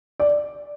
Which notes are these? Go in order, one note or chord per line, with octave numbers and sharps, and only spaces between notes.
D5